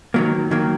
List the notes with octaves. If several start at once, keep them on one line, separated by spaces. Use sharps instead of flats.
D#3 F#3 A#3
D#3 F#3 A#3